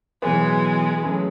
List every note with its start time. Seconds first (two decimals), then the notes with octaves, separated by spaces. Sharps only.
0.22 B2 E3 F#3 G#3 B3
1.02 F#3 A3 C#4 G#4 B4